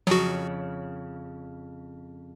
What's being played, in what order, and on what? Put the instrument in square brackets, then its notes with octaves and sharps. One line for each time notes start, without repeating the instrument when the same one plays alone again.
[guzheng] F2 C#3 [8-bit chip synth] F#3 F#4